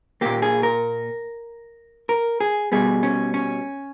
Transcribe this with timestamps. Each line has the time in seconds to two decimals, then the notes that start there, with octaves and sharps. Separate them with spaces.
0.21 A#2 A#3 G4
0.42 G#4
0.63 A#4
2.09 A#4
2.40 G#4
2.72 B2 G3 B3 G#4
3.03 C#4
3.34 C#4